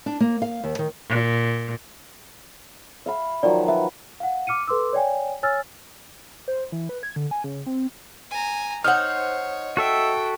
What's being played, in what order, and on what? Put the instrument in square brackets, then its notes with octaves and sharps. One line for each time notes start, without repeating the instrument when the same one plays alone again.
[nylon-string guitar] D4
A#3
F5
D#2
D#3
[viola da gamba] A#2
[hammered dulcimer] E5 F5 B5
[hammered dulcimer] D#3 F3 F#3 [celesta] D5
[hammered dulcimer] B4 [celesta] E5
[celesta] F5 F#5
D6 F6 C#7 D#7
A4 B4 C6 D6 E6
C#5 D5 G5 G#5
C#5 G#5 E6 F6 A6
[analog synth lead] C5
E3
B4
G#6
D3
G#5
C#3
C4
[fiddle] G#5 A#5
[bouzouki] D#4 C5 F#5 [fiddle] C#5 [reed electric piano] F6
[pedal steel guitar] F#4 A4 E5 [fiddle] G5